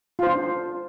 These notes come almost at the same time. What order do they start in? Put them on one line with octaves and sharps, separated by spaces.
F4 C5 D4